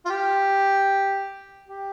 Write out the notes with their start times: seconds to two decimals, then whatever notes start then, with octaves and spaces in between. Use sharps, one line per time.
0.05 F4
0.10 G4
1.68 G4